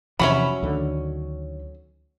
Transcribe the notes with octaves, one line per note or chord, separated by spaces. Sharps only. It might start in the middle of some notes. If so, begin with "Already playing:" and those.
E2 C3 F3 F#3 C#4 C#5 E5 B5
D2 D3 D#3